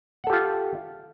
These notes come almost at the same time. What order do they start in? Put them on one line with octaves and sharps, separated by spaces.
F#5 A4 G4 F4